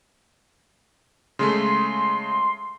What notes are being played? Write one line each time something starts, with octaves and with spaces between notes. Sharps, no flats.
C#3 G#3 A3 C6